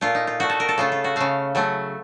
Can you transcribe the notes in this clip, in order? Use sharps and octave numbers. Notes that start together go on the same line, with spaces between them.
A#2 A3 F4
D#4
F4
A#2 A3 F#4
A4
A#4
A4
C#3 A3 F4
F4
F#4
C#3 A3 F5
C#3 F#3 A3